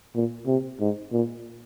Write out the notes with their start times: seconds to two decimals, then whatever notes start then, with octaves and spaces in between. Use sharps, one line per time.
0.15 A#2
0.47 C3
0.80 G#2
1.12 A#2